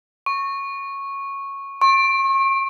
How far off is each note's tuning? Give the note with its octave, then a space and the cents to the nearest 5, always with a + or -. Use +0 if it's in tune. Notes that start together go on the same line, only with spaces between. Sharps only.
C#6 -10
C#6 -40